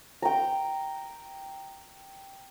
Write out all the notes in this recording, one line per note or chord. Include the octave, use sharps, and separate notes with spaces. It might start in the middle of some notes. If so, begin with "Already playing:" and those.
G5 A#5